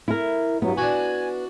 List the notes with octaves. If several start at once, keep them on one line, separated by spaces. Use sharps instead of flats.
E4 A#4
G2 F#3 B3
D4 F#4 G#5